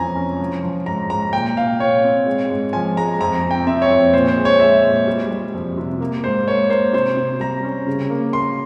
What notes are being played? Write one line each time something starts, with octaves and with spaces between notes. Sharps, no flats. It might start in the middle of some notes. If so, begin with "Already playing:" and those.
Already playing: F2 E3 C#4 G#5 A#5
C#4
F3
F3
G#2 A#5
G#2 A#5
A#2 G5
A#2 F5
A#2 C#5
C4
G#3
G#2
F3 G#5
G#3 A#5
F2 A#5
C4
G5
C4 E5
C#5
F2
A#2 C5
C5
G#3
C#5
G#3 E5
A#2
G3
G3
F2
C3
A#3
G#2 C5
A#3 C#5
A#3 C5
C3 C5
C3
G3 A#5
C#4
C#3
A#3
A#3 C6